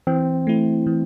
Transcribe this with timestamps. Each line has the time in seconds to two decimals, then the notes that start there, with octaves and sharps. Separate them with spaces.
0.07 E3 C4
0.47 A3 E4
0.86 E3